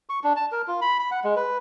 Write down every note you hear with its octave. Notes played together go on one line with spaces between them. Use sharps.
C#6
D4
A5
A#4
F4
B5
B5
F#5
G#3
B4